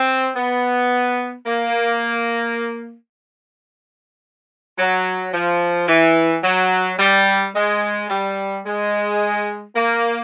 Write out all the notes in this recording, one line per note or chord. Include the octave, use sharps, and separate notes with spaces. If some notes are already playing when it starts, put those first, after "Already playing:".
Already playing: C4
B3
A#3
F#3
F3
E3
F#3
G3
G#3
G3
G#3
A#3